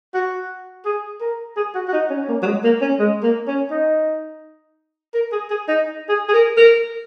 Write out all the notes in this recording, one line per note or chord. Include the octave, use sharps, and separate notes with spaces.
F#4
G#4
A#4
G#4
F#4
F#4
D#4
C#4
C#4
A#3
F#3
G#3
A#3
C#4
G#3
A#3
C#4
D#4
A#4
G#4
G#4
D#4
G#4
G#4
A#4
A#4